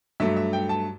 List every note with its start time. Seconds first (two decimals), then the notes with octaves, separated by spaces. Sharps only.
0.20 G2 F#3 A3 E5
0.36 E5
0.53 G5
0.69 A5